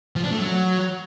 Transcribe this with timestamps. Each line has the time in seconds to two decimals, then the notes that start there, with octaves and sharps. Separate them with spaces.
0.16 F3
0.24 D4
0.31 A3
0.39 F#3